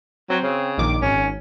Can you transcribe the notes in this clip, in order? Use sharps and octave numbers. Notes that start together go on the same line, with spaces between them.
F#3 C4
C#3
A#1 D#3 D6
G#1 C#4